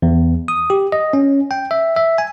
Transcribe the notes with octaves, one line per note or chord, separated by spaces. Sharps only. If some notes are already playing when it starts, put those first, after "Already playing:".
E2
D#6
G4
D#5
C#4
G5
E5
E5
G#5